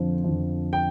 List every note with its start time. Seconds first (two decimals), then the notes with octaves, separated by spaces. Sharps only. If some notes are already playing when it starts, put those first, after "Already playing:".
Already playing: F2 D3 F3
0.24 F2 D3 F3
0.73 G5